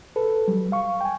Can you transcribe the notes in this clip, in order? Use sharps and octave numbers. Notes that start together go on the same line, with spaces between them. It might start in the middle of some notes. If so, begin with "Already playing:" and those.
A4 B4
F#3 G3
F5 C#6
G5 G#5